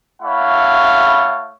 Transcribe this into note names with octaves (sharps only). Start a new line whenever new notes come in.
A3 E4 C#5 F5 F#5 B5